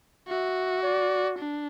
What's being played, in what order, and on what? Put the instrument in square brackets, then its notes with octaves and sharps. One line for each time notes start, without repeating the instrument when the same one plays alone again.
[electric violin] F#4 [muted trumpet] E5
[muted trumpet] D5
[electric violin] D4